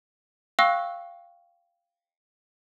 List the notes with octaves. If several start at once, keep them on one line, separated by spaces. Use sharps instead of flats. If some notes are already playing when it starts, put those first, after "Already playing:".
F5 G5 C#6 E6 F#6